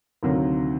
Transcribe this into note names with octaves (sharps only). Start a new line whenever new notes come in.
D2 C3 D#3 F#3 A#3